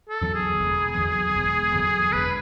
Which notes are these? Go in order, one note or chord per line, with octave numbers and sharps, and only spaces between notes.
A4
E2 D3 F#3
G#4
E1
E2 D3 F#3
E1
E2 D3 F#3
E1 B4